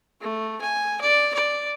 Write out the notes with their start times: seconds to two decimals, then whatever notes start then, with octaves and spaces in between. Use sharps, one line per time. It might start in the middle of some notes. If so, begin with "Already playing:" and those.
0.21 A3
0.61 G#5
1.01 D5
1.34 D5